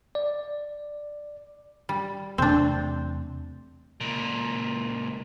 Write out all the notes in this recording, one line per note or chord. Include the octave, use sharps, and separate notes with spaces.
D5
G3
E2 C3 A3 C4 D4
C#2 A#2